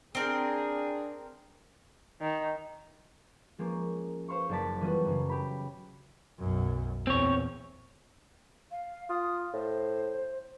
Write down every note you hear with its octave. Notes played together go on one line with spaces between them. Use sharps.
C4 D4 G#4 A#4
D#3
F3 G#3 A#3 C#4
C5 F5 C6 C#6
F#1 A4 D5 A5 B6
E3 G3 B3 C#4 F4 F#4
F#2 C#3
G4 B5
B1 F#2
E2 A#2 C4 C#5
F5
F4 D#6
A2 C5